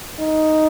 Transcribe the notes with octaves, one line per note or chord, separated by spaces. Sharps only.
D#4